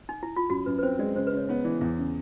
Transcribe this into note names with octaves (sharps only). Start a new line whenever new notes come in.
D#4
E4
F4
F#2 F#4
F#2 B4
B4
C4 C5
G#3 D5
C#3 C5
B4
C#3 C#5
B3 C#5
E3 D5
E2
C#3